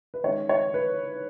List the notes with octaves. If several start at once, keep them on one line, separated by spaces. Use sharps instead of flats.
B4
D#3 G#3 C#4 C#5
C#5
B4